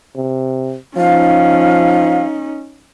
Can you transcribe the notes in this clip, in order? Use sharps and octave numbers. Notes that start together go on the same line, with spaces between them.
C3
F3 C#4 D#4 F5